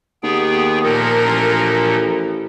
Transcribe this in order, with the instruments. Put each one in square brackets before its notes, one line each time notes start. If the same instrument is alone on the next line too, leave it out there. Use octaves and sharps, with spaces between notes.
[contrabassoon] D#2 [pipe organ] B3 G#4 G5
[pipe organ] A#2 F3 A4 [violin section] A#4
[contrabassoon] A1